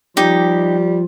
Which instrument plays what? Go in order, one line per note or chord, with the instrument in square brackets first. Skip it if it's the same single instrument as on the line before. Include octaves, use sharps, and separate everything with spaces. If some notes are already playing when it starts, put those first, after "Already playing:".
[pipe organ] F3 F4 [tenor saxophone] G3 [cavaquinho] D#4 G4